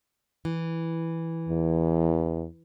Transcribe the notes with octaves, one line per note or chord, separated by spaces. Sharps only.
E3
E2